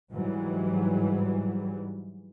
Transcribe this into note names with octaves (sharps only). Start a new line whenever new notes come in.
G#2 E3 F#3 G3